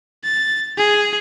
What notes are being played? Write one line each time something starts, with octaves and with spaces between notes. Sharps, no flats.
A6
G#4